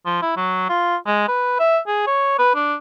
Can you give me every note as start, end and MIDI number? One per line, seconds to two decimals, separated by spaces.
0.06 0.21 53
0.22 0.33 64
0.36 0.68 54
0.69 0.96 65
1.06 1.25 56
1.28 1.57 71
1.59 1.79 76
1.87 2.03 68
2.07 2.35 73
2.39 2.53 71
2.55 2.75 62